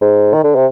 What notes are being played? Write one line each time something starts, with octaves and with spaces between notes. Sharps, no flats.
G#2
D#3
D3
C3